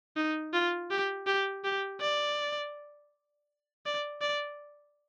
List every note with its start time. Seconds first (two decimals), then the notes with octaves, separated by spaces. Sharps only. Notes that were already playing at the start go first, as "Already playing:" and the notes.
0.17 D#4
0.53 F4
0.90 G4
1.27 G4
1.64 G4
2.00 D5
3.86 D5
4.21 D5